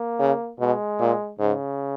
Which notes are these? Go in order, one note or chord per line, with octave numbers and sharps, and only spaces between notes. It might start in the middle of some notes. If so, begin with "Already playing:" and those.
Already playing: A#3
C#3
B2 G#3
A#2
G#2 C#3